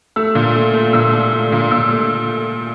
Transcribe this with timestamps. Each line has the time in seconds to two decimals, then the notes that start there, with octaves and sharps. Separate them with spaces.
0.16 A3 E6
0.35 A#2
0.56 A3
0.74 A3
0.93 A#2 E6
1.13 A3
1.33 A3
1.52 A#2
1.71 A#2 E6
1.91 A3